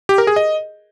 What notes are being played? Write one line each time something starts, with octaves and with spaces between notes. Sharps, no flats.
G4
A#4
G#4
D#5